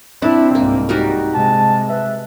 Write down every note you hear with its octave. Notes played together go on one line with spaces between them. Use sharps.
C4 D4 E4
C2 G#2 A#3
G3 D#4 F#4 A#4
C3 G#3 A5
B4 E5